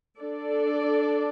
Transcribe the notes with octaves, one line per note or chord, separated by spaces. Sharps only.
D4 A4 D5